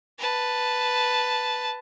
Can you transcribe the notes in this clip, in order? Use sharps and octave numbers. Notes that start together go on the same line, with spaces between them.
B4 A5